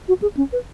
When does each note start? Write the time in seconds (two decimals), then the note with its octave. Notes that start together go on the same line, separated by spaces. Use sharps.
0.08 F#4
0.22 G#4
0.37 C#4
0.53 B4